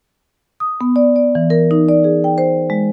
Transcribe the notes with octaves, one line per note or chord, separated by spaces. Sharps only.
D#6
B3
D5
D5
E3
A#4
D#4
D5
G#4
G5
C5
G#3